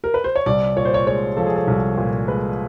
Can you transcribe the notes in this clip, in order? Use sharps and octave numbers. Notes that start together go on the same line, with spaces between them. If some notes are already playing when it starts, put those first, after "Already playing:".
A#4
B4
C5
C#5
C2 D5
A#2 C#5
C5
C#5
G#3 C#5
F3 A4
G#4
A4
C2
A#2
G#3 B4